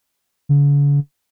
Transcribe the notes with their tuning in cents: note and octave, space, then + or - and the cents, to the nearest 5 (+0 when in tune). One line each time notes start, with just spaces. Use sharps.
D3 -45